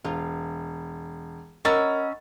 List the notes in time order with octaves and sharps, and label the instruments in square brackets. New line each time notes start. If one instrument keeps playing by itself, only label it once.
[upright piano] E1 [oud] F4
[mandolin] C#4 E6 [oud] A#4 [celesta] D#5 F#5 B5 [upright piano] A#5 A6